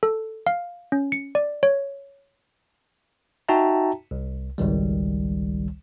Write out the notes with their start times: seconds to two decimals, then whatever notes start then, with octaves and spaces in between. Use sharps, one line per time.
0.03 A4
0.47 F5
0.92 C#4
1.12 C#7
1.35 D5
1.63 C#5
3.49 D#4 F#4 E5 G5 A5 A#5
4.11 C2
4.58 G#1 C#2 D#3 G3